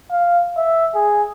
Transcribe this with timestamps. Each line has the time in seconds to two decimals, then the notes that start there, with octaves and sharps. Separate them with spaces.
0.11 F5
0.57 E5
0.95 G#4